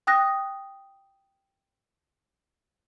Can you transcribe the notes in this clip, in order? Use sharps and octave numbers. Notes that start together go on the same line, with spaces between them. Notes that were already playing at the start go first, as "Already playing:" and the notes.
G5 D#6 F#6 A#6